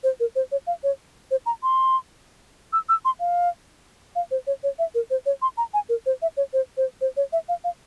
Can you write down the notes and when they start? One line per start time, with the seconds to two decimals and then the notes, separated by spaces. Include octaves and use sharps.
0.04 C5
0.20 A#4
0.36 C5
0.52 C#5
0.67 F5
0.84 C#5
1.31 C5
1.46 A#5
1.63 C6
2.73 E6
2.89 E6
3.05 C6
3.20 F5
4.16 F5
4.31 C5
4.47 C#5
4.63 C#5
4.79 E5
4.95 A#4
5.10 C5
5.26 C#5
5.42 C6
5.58 A#5
5.74 G#5
5.89 A#4
6.06 C5
6.22 E5
6.37 C#5
6.53 C5
6.77 C5
7.01 C5
7.17 C#5
7.33 E5
7.49 F5
7.64 F5